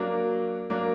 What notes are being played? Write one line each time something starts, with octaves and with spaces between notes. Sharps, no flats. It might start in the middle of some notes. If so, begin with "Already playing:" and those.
Already playing: F#3 A#3 D4
F#3 A#3 D4